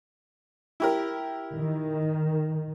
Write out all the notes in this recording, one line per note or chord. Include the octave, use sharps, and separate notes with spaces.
E4 G4 A#4
D#3